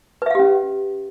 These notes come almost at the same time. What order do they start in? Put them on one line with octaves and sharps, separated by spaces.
B4 E5 F5 G4 C#4